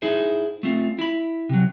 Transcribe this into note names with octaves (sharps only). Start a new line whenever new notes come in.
D#4 E4 G#4 C5
A3 C4 F4
E4 B5
C3 F#3